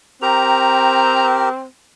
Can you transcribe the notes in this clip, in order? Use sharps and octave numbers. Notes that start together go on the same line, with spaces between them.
C4 G4 A#4 A#5